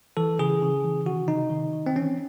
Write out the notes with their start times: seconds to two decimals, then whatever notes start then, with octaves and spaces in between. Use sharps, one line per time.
0.17 E3 A4
0.39 C#3 G#4
0.62 C#3
0.84 E3
1.06 D#3 F#4
1.28 C3 D#4
1.50 D#3
1.73 D#3
1.86 C4
1.96 E3 C#4